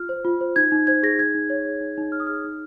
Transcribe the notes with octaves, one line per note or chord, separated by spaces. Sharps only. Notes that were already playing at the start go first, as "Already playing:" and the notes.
Already playing: F4 F6
C5
F4
C5
D#4 G#6
D#4
C5 G#6
G#4 A#6
D#4 G#6
D#4
C#5
G#4
D#4
D#4
C#5 F6
D#6
G#4 F6
D#4